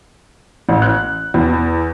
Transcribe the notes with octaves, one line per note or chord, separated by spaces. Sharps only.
A1
F#6
E2